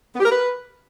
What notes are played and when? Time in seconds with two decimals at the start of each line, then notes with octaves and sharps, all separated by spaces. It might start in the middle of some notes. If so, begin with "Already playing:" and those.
0.15 B3
0.20 G4
0.25 A#4
0.31 B4